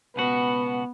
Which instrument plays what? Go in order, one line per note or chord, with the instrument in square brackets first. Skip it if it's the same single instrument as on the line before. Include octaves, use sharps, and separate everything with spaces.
[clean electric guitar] C#2 B2 F#4 [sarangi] B3